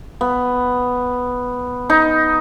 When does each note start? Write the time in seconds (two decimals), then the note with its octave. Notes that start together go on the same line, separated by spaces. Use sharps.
0.21 B3
1.90 D#4